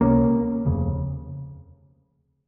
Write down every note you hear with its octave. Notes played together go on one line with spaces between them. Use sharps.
C#2 C3 A#3 C#4
F1 D#2 C#3